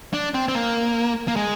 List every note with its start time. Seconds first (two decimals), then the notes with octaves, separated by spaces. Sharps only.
0.13 D4
0.34 C4
0.48 C4
0.55 A#3
1.28 A#3
1.36 G#3